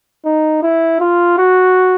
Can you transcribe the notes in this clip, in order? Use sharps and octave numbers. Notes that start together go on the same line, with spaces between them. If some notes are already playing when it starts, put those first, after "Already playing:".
D#4
E4
F4
F#4